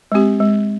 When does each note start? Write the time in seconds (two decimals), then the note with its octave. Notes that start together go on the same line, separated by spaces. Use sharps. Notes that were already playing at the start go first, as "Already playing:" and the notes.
0.12 G#3 C4 G4
0.40 G#3